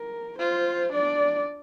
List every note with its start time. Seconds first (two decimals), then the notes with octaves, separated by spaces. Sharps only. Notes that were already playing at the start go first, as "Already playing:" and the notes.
Already playing: A#4
0.39 F4 C5
0.92 D4 D5